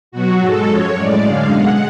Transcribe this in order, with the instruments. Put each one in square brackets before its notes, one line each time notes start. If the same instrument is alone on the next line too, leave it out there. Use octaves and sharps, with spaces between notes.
[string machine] B2 F#3 F#4
G#2 G#3 A4
F#2 F3 G#3 C#5
A2 G#3 D5
F#2 D3 G#3 F5
B2 G#3 F#5